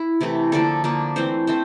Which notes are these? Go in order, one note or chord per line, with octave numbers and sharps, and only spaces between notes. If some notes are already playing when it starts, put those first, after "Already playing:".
Already playing: E4
C3 E3 A3
D3 F3 A#3 D4 A4
D3 F3 A#3 D4
E3 A3 C4 C5
A3 C4 C5